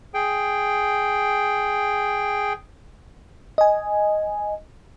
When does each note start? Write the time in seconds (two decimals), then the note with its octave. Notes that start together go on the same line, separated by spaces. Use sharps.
0.14 G#4 G5
3.58 D#5 G#5